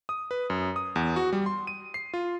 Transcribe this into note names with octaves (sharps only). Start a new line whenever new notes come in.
D#6
B4
F#2
D#6
E2
F#4
G3
C6
D#7
C7
F4